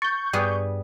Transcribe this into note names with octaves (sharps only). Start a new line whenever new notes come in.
C#6 G6 A6
G2 G3 B3 G#4 D5 D#6 F#6